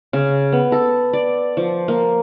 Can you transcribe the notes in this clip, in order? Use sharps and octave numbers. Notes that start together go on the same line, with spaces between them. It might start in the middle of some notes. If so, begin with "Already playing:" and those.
C#3
B3
A4
D5
F3
A#3